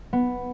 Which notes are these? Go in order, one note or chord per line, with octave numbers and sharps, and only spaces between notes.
B3